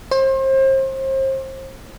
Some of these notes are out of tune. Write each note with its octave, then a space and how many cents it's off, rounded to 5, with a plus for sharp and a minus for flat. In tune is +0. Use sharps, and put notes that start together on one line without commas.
C5 +35